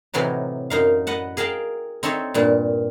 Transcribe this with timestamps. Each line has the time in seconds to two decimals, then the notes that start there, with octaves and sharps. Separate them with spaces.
0.14 A2 C3 E3 F#3 D#4
0.70 F#2 D#4 F5
1.07 B4 D#5 F#5 A5
1.37 G#4 A#4 F5 G5 A5
2.03 C4 D#4 A4 C#5 E5
2.34 G2 A#2